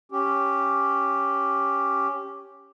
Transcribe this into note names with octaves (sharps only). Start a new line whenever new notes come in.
C#4 G4